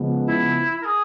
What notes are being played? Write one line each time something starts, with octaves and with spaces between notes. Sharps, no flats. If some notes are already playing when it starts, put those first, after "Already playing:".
Already playing: C#3 F3 G#3 B3
E4
A#4
G#4